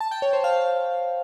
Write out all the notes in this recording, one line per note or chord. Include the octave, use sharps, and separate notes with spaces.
A5
G5
C#5
C5
F5